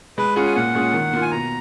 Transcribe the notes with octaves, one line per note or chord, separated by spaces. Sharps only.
G#3 B4
C#4 F4 G#4 F#5
G#5
A#2 F#5
G#3 C#4 F4 G#4
D#3
A#3 F4
G#5
B2 A#5